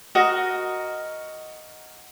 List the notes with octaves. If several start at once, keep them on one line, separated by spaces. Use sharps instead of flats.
F#4 A#4 D#5